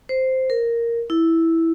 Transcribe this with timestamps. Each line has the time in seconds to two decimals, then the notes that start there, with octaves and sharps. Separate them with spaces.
0.09 C5
0.50 A#4
1.10 E4